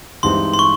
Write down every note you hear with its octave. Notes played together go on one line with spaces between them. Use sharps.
G2 E3 G#3 C4 D#4 C6
C6
C#6